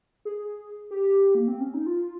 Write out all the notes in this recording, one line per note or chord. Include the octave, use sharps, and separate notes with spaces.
G#4
G4
A#3
C4
C#4
D#4
F4